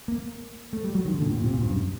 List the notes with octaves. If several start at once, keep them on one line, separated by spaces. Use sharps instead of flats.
A#3
A3
G3
F#3
D#3
D3
A#2
A2
A#2
C3
A#2
G2
F#2